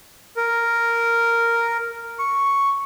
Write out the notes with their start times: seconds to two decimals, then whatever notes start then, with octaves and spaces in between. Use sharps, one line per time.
0.37 A#4
2.19 C#6